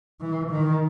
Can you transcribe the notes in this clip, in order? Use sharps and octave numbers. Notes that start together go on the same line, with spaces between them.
E3
D#3